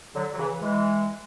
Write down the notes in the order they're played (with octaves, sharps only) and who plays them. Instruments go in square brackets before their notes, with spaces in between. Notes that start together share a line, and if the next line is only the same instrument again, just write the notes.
[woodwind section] D3 F#3
F#3
C#3 E3
E3 G#3